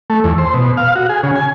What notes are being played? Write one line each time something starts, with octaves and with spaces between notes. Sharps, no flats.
A3
E2
C5
B2
F5
F#4
G#4
C#3
G#5